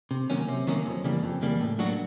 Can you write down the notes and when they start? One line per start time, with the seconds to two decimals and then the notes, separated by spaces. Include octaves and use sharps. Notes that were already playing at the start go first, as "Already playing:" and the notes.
0.11 C3
0.30 D#3 F#3 A#3 C#4
0.48 C3
0.67 D#3 F#3 A#3 C#4
0.86 F2
1.04 C#3 E3 G3 A#3
1.23 F2
1.42 C#3 E3 G3 A#3
1.61 A2
1.79 F#3 A#3 D4 F#4